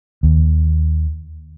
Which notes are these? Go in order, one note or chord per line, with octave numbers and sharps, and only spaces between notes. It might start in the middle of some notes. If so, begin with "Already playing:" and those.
D#2